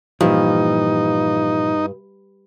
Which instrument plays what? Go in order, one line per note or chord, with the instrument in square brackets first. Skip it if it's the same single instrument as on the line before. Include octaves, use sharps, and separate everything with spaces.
[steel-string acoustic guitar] G2 [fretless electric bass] A#2 E3 F3 [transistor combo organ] D#4